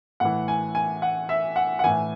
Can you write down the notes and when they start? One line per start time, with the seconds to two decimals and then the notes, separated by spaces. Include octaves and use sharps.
0.20 A2 E3 F#5
0.48 G#5
0.75 G#5
1.02 F#5
1.29 E5
1.56 F#5
1.79 F#5
1.84 A2 E3 G#5